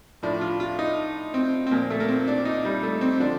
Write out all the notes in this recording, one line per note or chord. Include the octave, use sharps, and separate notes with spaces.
A2 F3 D4
F4
F4
D#4
C4
C4
A#2 F3 A#3
A3
A#3
C4
D4
D4
D#4
G3
A3
C4
D3 F3 D4